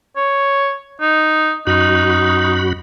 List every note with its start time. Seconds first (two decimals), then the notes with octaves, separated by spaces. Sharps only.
0.17 C#5
1.01 D#4
1.67 F#2 D#4 F#4 B5